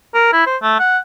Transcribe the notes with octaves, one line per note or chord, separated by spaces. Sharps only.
A#4
E4
C5
A3
F#5